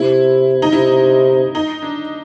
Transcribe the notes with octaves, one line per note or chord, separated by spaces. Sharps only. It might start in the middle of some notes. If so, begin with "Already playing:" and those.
Already playing: C3 E4
D#4
C3 E4
D#4
D4